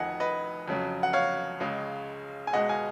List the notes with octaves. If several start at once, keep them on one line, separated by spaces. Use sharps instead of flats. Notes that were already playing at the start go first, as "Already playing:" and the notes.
Already playing: F1 F2 D#3 D#5 F#5 G#5
B4 D#5
F2 C#3 F#3
F#5
C#5 F5
C#2 C#3 G#3
G#5
C#2 B2 G#3 D#5 F#5
F5 G#5